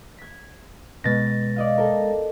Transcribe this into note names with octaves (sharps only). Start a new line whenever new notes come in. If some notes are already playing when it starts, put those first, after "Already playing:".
G#6 B6
B2 G#3 A6 A#6
D5 D#5 F5
A4 A#4